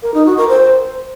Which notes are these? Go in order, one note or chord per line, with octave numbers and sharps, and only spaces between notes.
A#4
D#4
F#4
A#4
C5